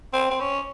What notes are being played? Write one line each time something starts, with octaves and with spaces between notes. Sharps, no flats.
C4
C4
C#4